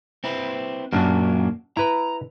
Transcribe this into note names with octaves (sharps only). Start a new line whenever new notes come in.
C4 E4 B4
F#2 A#2 F#3 A#3 D4
E4 B4 A#5